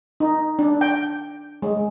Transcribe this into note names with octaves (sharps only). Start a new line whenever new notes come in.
D#4
D4
G5
G#3